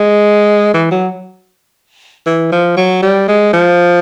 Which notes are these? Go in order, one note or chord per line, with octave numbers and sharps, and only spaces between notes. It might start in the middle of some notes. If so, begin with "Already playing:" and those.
Already playing: G#3
E3
F#3
E3
F3
F#3
G3
G#3
F3